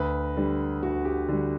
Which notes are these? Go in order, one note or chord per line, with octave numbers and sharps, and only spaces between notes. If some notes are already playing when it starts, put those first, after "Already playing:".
Already playing: D2 B4
D3 G3
D2 F#4
G4
D3 G3